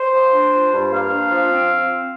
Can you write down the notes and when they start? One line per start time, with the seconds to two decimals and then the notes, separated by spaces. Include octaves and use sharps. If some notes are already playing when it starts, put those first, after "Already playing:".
Already playing: C5
0.13 F3
0.33 D4
0.53 F3
0.73 G2
0.91 A#3 F5
1.11 D4
1.30 F3
1.50 C4